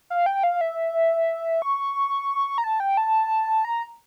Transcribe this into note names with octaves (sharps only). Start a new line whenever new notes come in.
F5
G5
F5
E5
C#6
A#5
A5
G5
A5
A#5